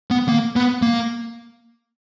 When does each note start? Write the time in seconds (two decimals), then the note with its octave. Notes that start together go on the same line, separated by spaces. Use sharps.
0.11 B3
0.28 A#3
0.56 B3
0.82 A#3